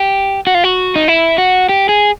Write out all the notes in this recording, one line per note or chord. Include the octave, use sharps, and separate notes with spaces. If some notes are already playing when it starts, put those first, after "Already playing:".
Already playing: G4
F#4
F4
F#4
D#4
E4
F#4
G4
G#4